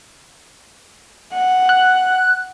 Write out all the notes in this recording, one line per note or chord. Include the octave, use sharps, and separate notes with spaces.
F#5
F#6